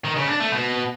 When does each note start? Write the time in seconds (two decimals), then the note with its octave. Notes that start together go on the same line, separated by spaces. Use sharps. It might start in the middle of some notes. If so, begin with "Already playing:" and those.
0.05 D#3
0.17 C#3
0.28 D4
0.40 A3
0.52 B2